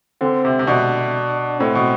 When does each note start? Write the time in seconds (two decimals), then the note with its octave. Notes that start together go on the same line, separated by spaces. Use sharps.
0.21 D3 C4
0.45 C3
0.59 C3
0.67 B2 D4
1.60 A2 C4
1.75 B2